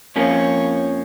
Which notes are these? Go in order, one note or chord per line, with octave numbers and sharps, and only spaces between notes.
F2 F3 A#3 C#4 C#5